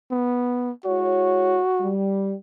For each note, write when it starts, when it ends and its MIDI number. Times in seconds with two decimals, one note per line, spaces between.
0.11 0.71 59
0.85 1.58 56
0.85 1.58 64
0.85 1.90 66
0.85 1.58 73
1.81 2.34 55